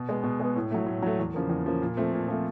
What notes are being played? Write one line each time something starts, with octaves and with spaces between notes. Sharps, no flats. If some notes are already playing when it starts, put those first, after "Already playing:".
Already playing: B2
G#3 B3
B2
G#3 B3
A2
F#3 A3
A2
F#3 A3
E2
C#3 F3 A#3
E2
C#3 F3 A#3
A#2
F3 A3 C4
A#2
F3 A3 C4